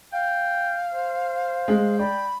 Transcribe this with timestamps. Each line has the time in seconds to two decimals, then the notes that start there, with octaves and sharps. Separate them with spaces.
0.12 F5 G5
0.92 C5
1.68 G#3
1.99 D5 G5 B5